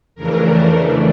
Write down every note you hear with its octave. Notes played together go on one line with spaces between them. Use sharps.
F2 C#3 E3 A3 D4 A#4